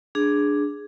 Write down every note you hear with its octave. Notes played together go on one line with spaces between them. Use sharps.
D4 G#4